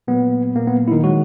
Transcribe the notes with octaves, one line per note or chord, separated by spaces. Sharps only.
A#2 F#3 A#3 B3
A#2 F#3 A#3
B3
E4
D#3 D#4
D#3 F#3 G#3 F#4